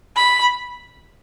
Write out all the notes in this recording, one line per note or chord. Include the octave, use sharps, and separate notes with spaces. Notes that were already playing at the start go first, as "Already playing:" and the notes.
B5